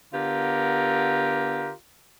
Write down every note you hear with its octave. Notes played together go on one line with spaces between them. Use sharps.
D3 B3 F4 G4 A#4